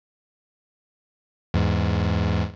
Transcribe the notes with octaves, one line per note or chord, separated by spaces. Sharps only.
E2 G#2